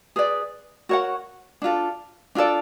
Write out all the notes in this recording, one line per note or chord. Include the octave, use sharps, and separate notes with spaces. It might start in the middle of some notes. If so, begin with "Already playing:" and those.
G#4 B4 D5
F#4 A#4 C#5 F#5
D4 F4 A4
D4 F4 A4 D5